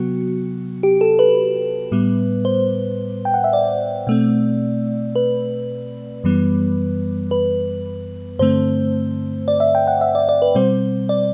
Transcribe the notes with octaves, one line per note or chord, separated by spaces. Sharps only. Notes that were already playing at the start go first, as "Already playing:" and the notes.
Already playing: C3 F#3 B3 F#4
G4
A4
B4
A2 G3 B3
C5
G5
F#5
E5
D5
B2 A3 C4
B4
F#2 E3 G3 B3
B4
G2 D3 A3 C4 C5
D5
E5
G5
F#5
E5
D5
D5
B4
B2 G3 C4 C5
D5